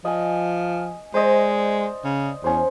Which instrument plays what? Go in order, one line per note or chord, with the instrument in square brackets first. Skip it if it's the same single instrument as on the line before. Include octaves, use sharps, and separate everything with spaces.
[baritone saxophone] F3 [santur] D#5 G#5
[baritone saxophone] G#3 [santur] C5 D5 D#5
[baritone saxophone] C#3
[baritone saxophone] E2 [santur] C#4 C5